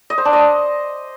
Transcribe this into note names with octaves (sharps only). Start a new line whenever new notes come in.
D#5
C5
D4
D#5